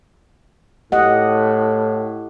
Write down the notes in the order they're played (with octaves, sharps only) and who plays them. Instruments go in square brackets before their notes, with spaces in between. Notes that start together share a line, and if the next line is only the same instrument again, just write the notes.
[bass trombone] A2 [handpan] G4 D#5 F#5